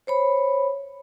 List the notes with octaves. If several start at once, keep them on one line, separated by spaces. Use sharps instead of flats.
C5 C#5 B5